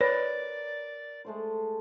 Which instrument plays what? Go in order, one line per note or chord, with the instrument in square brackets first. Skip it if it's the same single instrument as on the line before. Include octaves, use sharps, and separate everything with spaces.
[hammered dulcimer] A#4 [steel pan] B4 [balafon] C#5 [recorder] D5
[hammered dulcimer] G#3 A3 C5